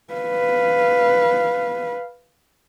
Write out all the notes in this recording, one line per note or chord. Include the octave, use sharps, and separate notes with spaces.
B4 F5